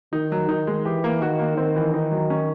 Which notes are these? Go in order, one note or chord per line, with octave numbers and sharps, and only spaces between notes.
D#3 D#4
F#3
D#3 D#4
G#3
E3 G4
A#3
D#3 F#4
A#3
D#3 C4
E3
D#3 D#4
F#3
C#4